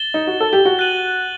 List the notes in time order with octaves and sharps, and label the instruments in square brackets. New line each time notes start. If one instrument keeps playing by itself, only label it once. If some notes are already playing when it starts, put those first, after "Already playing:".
Already playing: [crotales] A6 E7 G7
[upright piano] D#4
F#4
A4
G4
F#4
[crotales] F#6 A6 D#7 F#7